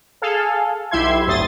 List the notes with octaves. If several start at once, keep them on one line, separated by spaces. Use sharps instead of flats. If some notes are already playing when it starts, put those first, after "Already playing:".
G#4 A4 F5 G#5
B1 E4 G4 E5 C6 G#6
G1 D2 A2 C6 D#6 A6